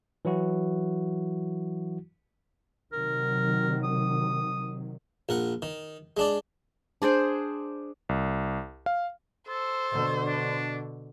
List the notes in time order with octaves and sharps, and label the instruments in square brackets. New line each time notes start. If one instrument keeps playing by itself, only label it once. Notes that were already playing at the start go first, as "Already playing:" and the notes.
[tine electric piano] E3 F#3 E4 F#4
[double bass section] C3 D#3 F#3 [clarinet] A#4
[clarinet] D#6
[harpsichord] A#1 A#4 F#5
D#3
G#3 D4 D5
[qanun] D4 G#4 C5 D5
[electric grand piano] C2
F5
[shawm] A4 [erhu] C5
[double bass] B2 D3
[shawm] D4